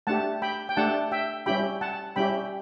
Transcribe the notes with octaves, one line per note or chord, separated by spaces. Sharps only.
A3 D4 G4 F#5 A5
G5 B5
G5
A3 D4 G4 F#5 A5
E5 G5
G3 C#4 E4 G4 G5 B5
F#5 A5
G3 C#4 E4 G4 G5 B5